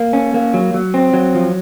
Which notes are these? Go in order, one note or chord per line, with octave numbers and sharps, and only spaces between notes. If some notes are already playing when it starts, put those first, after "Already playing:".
Already playing: A#3
C#4
A#3
F#3
F#3
C4
F#3
F3